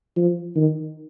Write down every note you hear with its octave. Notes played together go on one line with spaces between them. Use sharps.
F3
D#3